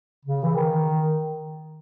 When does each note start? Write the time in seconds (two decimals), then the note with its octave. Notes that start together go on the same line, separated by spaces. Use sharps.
0.25 C#3
0.43 E3
0.54 D#3